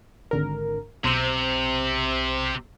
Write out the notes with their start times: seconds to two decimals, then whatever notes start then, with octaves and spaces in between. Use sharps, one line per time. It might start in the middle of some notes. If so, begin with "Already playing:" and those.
0.31 G#1 D3 A#4
1.04 B1 C3 C5 E6